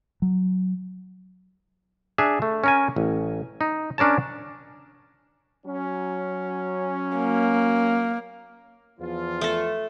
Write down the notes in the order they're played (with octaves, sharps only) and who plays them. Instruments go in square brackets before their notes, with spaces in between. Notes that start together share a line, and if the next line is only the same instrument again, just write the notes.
[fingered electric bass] F#3
[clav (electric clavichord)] D4 G#4 E5
A3
C#4 A#4 G#5
A1
D#4
C#4 D4 A#4 C#5 A5
[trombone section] F#3 C#4
[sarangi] A#3
[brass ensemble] E2 F3 F4
[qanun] A3 A4